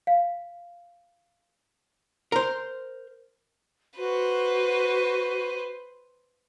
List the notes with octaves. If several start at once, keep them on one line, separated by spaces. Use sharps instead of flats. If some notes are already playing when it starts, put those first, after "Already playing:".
F5
A#4 C5
F#4 B4 C5